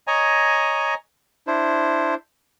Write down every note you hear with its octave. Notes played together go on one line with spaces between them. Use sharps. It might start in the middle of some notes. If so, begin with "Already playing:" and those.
C#5 D#5 G#5 A#5
D4 E4 C5